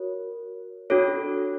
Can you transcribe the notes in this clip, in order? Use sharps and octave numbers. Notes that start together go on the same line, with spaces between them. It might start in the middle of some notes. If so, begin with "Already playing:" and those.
Already playing: F#4 A#4 C#5
D4 F#4 A4 C#5